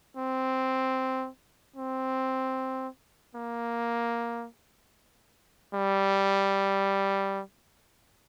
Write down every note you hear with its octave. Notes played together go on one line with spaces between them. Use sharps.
C4
C4
A#3
G3